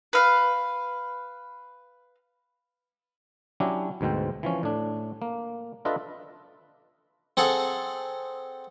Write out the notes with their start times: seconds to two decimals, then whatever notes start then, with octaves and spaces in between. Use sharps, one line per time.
0.13 B4 F5
3.60 F#3 C#4 D4 E4 G4
4.01 D2 G#2 B2 C4 G5
4.43 E3 F3 C#4
4.63 A2 D4
5.22 A#3
5.85 D4 F4 A4 B4 D#5 E5
7.37 C4 G#4 A4 F#5